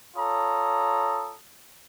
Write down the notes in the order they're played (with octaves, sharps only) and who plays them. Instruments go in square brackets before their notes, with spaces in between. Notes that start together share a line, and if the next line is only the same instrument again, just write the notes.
[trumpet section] F4 A4 C#5 A#5 D#6